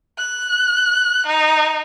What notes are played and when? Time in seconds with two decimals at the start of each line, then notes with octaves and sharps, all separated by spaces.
0.18 F#6
1.27 D#4